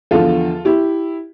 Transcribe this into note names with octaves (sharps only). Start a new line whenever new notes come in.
E2 D3 F3 F4 A4
E4 G4